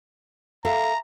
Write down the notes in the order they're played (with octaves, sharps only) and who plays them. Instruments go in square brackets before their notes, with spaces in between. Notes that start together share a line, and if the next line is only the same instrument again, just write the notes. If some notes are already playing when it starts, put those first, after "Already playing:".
[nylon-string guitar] A4 E5 F5 [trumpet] A#5